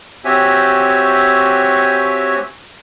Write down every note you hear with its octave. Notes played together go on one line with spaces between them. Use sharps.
C4 F#4 G4 C#5 E5 G#5